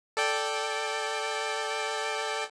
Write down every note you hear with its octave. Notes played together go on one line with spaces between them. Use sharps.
A4 D5 G5